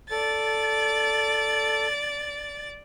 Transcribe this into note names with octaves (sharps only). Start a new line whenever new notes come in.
A4 D5 A6